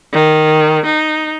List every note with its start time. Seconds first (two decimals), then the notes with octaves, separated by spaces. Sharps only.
0.13 D#3
0.86 D#4